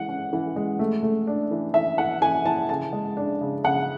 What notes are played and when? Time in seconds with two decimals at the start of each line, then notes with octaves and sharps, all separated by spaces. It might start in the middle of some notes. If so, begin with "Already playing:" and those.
Already playing: E3 G#3 F#5
0.08 C#4
0.33 E3
0.56 G#3
0.79 A3
1.03 A3
1.27 D4
1.51 E3
1.74 E3 E5
1.98 E3 F#5
2.22 E3 G#5
2.45 E3 A5
2.69 C#3 A5
2.93 G#3
3.17 D4
3.41 C#3
3.64 C#3 F#5